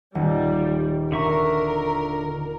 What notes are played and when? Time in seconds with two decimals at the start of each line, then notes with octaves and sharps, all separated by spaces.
0.15 D#1 G3
1.12 D3 A#4 E5 C#6